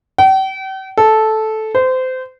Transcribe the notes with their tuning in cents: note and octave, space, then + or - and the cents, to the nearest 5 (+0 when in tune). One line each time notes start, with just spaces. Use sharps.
G5 -40
A4 -10
C5 -25